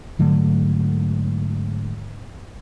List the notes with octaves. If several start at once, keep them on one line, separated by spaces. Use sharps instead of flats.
G#2 D3 F#3 A3